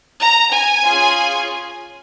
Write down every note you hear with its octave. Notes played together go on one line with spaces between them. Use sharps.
A#5
G#5
C#4 F4 G#4